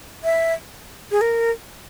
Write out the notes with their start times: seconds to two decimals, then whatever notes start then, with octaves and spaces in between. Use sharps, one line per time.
0.24 E5
1.11 G#4
1.21 A#4